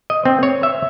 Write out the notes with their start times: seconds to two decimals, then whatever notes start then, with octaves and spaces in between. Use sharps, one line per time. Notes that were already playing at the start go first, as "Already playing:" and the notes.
0.10 D#5
0.25 C4
0.43 C#5
0.63 E5